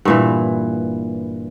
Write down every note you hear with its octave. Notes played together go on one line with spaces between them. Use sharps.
G2 A#2 E3